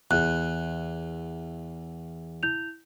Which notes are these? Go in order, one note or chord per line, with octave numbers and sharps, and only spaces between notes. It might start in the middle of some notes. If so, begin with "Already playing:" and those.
E2 F#6
E4 G6 F7